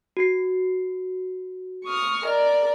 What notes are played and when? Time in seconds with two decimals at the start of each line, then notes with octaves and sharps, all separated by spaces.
0.17 F#4 C7
1.84 C#6 D#6 F6
2.25 A#4 D5 D#5